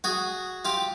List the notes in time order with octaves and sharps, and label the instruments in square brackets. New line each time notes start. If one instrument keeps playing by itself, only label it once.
[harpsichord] F#4 G#4
F4 G4